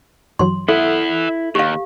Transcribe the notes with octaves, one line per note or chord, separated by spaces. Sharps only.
G2 E3 F#3 C6
E4 A4 E5 F#5
D#2 G4 F5